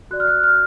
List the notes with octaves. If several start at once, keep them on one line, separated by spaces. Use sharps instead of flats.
F#4 D5 F#6
F6
F#6
F6